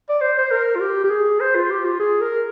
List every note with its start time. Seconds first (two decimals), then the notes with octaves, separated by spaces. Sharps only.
0.09 D5
0.21 C5
0.38 C5
0.51 A#4
0.76 F4
0.80 G4
1.04 G4
1.11 G#4
1.40 C5
1.55 F4
1.70 G4
1.85 F4
2.00 G#4
2.21 A#4